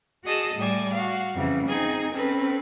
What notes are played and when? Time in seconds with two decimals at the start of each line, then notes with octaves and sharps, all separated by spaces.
0.25 F#4 G#4 D#5 A5 E6
0.56 A2 G3 D5 G#5
0.94 F#4 F5
1.35 F2 C#3 E3
1.68 C4 D#4 G#4 G#5
2.14 C4 C#4 A4 B4